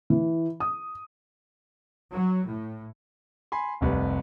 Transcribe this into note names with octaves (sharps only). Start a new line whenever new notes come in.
E3
D#6
F#3
A2
G#5 B5 C6
F1 C2 B4